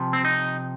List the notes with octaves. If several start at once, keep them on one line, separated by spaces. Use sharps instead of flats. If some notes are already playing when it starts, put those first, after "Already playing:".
Already playing: C3 F3
C4
D#4